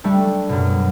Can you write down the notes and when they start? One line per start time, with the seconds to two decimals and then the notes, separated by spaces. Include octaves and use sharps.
0.04 G3 A3 D4
0.49 F#2 B2